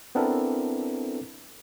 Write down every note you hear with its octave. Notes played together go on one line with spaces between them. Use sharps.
B3 C4 D4 E4 A4 A#4